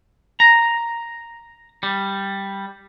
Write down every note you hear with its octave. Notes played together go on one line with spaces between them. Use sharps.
A#5
G3